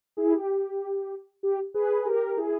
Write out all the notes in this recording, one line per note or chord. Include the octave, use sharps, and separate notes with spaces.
E4 G#4
G4
G4
G#4 B4
G4 A#4
E4 G#4